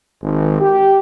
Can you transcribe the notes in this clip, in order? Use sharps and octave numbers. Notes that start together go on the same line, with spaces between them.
G#1
G4